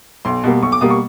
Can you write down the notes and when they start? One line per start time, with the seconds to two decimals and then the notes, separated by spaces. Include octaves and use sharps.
0.25 B1 C6
0.44 B2 G3 A#3
0.62 B1 C#6
0.72 D6
0.81 B2 G3 A#3 D#6
0.90 C#6